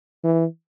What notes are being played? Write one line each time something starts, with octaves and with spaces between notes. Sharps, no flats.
E3